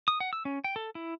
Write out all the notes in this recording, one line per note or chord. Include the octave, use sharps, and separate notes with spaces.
D#6
F#5
E6
C#4
G5
A4
E4